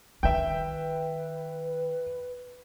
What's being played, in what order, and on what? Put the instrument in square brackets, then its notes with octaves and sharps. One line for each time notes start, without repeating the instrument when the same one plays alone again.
[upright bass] D#3 F4 [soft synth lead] B4 [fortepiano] E5 G5